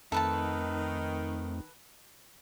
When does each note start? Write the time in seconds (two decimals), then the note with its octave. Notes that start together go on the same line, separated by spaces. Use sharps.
0.12 F2 D#3 A3 C4 A4 B4 A5